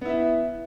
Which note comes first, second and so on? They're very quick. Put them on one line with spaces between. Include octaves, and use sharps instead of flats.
B3 E4 E5